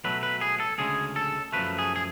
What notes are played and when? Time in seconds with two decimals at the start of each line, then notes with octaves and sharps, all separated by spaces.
0.04 B2 F#3 A3 B4
0.23 B4
0.41 G#4
0.60 A4
0.78 D2 C#3 G#3 G#4
1.16 A4
1.53 F#2 F3 A3 B4
1.78 G#4
1.96 G#4